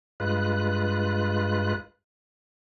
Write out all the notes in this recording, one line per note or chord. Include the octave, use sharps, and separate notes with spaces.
G2 G#3 F4 B4 F#6